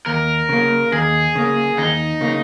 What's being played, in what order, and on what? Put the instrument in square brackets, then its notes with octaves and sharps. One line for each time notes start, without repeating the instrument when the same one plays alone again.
[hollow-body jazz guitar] D#2 [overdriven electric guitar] A#4
[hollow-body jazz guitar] C#3 A#3
[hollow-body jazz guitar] D#2 [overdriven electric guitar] G#4
[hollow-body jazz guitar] C#3 A#3
[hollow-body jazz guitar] D#2 [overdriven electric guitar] D#4
[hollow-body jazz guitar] C#3 A#3